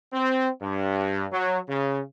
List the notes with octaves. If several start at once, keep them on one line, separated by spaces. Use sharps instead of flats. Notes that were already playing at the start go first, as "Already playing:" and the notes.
C4
G2
F#3
C#3